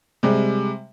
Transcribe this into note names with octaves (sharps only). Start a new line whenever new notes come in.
C3 G3 G#3